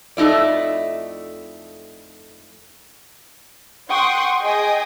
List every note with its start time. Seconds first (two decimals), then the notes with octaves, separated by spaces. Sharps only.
0.17 F2 A3 D#4 E4 D5
3.89 F#5 G5 C6 C#6 D#6
4.42 G#4 D#5 G5 G#5 D#6